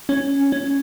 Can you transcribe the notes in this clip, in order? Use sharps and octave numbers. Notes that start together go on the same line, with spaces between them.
C#4
C#4